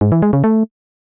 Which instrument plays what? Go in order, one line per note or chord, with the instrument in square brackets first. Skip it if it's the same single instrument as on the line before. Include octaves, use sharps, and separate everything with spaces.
[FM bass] G#2
E3
G#3
C#3
A3